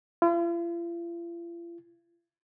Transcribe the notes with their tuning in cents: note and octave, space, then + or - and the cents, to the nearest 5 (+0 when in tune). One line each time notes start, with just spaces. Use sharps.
F4 -45